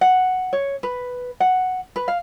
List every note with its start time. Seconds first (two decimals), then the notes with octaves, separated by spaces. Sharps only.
0.01 F#5
0.53 C#5
0.83 B4
1.40 F#5
1.96 B4
2.08 F5